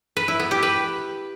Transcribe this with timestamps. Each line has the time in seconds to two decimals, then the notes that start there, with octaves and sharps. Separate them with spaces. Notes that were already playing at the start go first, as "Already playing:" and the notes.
0.17 B4
0.28 E4
0.40 B3
0.51 G4
0.63 B4